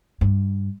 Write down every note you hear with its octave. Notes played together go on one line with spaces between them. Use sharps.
G2